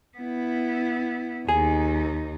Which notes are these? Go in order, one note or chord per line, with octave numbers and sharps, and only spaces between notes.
B3 E4
D#2 D#4 G#4